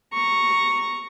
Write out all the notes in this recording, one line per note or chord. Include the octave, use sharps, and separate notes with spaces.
A#5 C#6